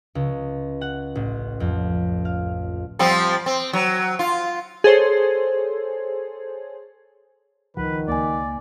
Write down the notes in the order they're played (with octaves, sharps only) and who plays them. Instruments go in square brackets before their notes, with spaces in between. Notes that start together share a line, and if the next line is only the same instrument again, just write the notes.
[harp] C#2
F#5
A1
F2
F5
[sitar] F3 G3 C4
C4
F#3
F4
[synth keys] G#4 A4 C5 C#5
[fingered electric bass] C#2 F3 [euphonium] D#3 [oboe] B4 [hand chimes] F#5
[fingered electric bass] C#2 [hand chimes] A#3 G#5 [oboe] D5